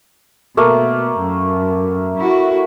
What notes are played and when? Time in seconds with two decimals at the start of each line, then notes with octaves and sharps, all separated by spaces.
0.57 B2 A3 A#3
1.19 F#2
2.18 E4 F#4